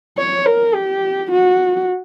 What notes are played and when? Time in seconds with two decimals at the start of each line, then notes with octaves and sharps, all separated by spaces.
0.18 C#5
0.46 A#4
0.75 G4
1.31 F#4